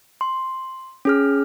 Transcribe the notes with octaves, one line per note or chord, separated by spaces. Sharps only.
C6
C#4 G#4 F6